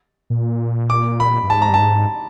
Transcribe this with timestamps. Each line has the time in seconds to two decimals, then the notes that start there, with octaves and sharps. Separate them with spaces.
0.30 A#2
0.90 D6
1.20 B5
1.43 G2
1.50 G#2 A5
1.62 A#5
1.69 G2 A5
1.80 G#2